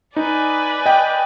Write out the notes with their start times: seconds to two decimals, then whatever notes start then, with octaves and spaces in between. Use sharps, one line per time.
0.16 D#4 B4 D5 G#5
0.86 D#5 G5